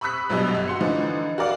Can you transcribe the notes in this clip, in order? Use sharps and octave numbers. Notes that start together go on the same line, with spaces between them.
B5 C#6 D#6 E6 F#6 B6
A#1 B2 F#3 G3 D#5 E6
G1
F#4 C6 C#7
D3 E3 F3 D#4
F#4 A#4 D5 F5